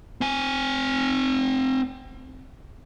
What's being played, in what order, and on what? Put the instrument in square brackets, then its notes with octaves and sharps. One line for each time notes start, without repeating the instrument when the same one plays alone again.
[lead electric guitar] C4 G#5